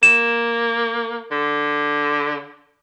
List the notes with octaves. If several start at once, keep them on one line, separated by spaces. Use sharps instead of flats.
A#3 E7
D3